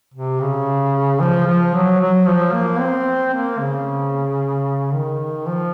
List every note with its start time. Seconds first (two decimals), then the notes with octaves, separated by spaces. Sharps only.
0.14 C3
0.41 C#3
1.20 F3
1.47 F3
1.74 F#3
2.01 F#3
2.27 F3
2.53 A#3
2.80 C4
3.34 A#3
3.60 C#3
4.93 D#3
5.47 F3